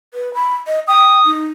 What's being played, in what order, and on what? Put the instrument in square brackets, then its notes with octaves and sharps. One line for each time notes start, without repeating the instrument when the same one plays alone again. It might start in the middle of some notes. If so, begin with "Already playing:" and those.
[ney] B4
B5
D#5
[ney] G5 [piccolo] D#6
[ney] D#4